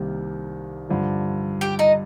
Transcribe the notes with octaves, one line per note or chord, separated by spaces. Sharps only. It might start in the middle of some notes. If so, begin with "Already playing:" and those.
Already playing: C2 C3 D#3 G3 A#3
G2 D3 F3
G4 G5
D#4 D#5